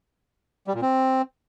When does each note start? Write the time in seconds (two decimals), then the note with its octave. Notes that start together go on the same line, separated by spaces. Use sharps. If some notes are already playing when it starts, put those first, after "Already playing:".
0.67 G3
0.75 A#2
0.82 C4